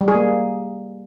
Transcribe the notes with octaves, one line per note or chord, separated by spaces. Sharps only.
G3
G#4
A#3